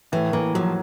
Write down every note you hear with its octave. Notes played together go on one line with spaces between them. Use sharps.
A2 E3
E3 A#3
F3 F#3